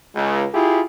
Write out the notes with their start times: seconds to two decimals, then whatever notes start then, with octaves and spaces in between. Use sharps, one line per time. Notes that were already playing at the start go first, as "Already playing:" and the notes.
0.15 C#2
0.52 E4 F4 G4 G#4